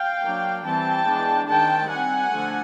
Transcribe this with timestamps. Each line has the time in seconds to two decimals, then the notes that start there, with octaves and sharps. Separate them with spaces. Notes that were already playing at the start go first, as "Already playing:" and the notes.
Already playing: F5 G5
0.23 F#3 A#3 D4
0.64 E3 G3 C4 G5 A5
1.07 E3 G#3 B3 D4
1.48 D#3 G#3 C4 G5 A5
1.90 G3 C4 F#5 G#5
2.31 D3 F3 A3